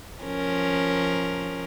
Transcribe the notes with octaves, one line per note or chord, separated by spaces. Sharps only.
F3 C#4 A#4